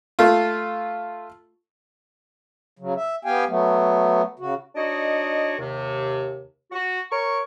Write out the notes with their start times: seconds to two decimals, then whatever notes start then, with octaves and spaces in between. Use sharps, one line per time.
0.19 A3 F4
2.79 C#3 F#3
2.96 E5
3.25 B3 G4 F5 G5 G#5
3.48 F#3 A3 B3
4.39 C#3 F#4
4.75 D4 D#4 F#4 C#5 D#5
5.58 D#2 C3
6.72 F#4
7.11 A#4 C#5 C#6